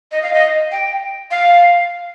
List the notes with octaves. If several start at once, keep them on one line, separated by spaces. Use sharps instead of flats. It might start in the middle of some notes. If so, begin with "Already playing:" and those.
D#5
F5
D#5
G5
F5